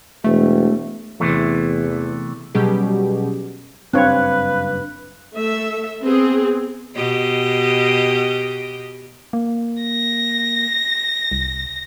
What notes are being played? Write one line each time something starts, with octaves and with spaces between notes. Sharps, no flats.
E1 A3
E2 C3 E3 A3
B2 F#3 G3 C#4 G4 G#4
F#1 G2 C4 D4 B4 C#5 F5 F#6
A3 A4 E5
B3 C4 G#4
B2 G4 D#5
A#3
A#6
C2